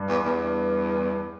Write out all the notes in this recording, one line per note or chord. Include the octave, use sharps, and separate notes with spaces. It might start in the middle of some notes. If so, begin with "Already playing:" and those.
Already playing: G2
E2
E2